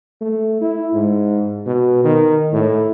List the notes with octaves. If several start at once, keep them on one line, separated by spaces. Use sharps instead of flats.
A3
E4
G#2
B2
D#3
A2